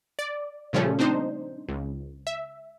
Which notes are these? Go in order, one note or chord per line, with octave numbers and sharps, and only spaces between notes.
D5
A#2 C#3 F3 G3 A3 C#4
C4 D4 D#4 C5
C#2
E5